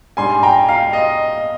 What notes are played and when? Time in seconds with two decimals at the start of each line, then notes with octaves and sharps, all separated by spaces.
0.17 G#2 G3 D4 G#5 C6
0.43 G5 A#5
0.68 F5
0.93 D#5